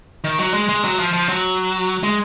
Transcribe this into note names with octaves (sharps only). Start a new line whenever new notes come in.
D#3
F#3
G#3
G#3
F#3
F3
F3
F#3
G#3